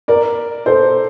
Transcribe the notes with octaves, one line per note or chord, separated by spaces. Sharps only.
A#4 D5
A4 C5